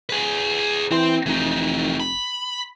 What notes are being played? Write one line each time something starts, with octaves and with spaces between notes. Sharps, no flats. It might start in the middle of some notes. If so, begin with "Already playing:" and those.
G#4 B4
E3 C4 C6
F1 E3 D#4
B5